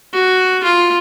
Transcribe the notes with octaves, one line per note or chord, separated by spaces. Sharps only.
F#4
F4